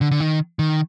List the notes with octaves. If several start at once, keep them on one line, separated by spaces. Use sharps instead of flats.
D3
D3
D#3
D#3